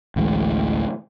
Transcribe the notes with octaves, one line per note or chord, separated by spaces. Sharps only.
A1 D2 E3 G#3